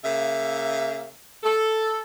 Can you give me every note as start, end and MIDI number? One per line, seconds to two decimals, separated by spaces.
0.04 1.10 49
0.04 1.10 58
0.04 1.10 76
1.43 2.01 69